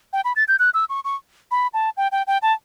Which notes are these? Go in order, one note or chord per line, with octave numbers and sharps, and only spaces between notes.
G5
B5
A6
G6
F#6
E6
C#6
C#6
B5
A5
G5
G5
G5
A5